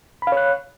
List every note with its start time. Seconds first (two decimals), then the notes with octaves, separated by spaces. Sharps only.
0.22 B5
0.27 F5
0.32 C#5
0.37 F#6